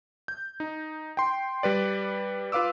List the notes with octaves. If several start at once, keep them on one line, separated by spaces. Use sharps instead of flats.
G6
D#4
G5 C6
G3 B4 D5
F4 B4 F5 D6 E6